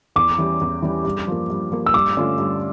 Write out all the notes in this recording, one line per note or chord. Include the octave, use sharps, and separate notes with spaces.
E2 D6
E3 G3 C#4 G4
E2
E3 G3 C#4 G4
G2
F3 A#3
G2
F3 A#3
E6
G2 D6
D3 A3 C#4 F4
G2